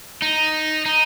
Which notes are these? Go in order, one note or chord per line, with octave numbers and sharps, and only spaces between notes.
D#4
D#4